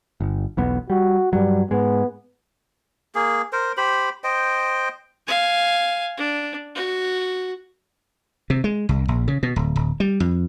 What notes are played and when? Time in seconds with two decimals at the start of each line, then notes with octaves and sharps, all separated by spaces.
0.20 G1
0.57 E1 B1 B3
0.90 G3 F#4
1.33 G2 F#3 G3
1.71 G#2 G#3 B3
3.15 A#3 G#4
3.53 A#4 C5
3.77 G4 C5 B5
4.24 C5 D#5 G5
5.27 F5 G#5
6.18 D4
6.75 F#4
8.50 C3
8.64 G#3
8.89 C2
9.08 A#1
9.28 C#3
9.43 B2
9.56 D1
9.76 D1
10.00 G3
10.20 F2